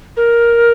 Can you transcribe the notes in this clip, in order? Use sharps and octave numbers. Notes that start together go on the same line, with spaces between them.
A#4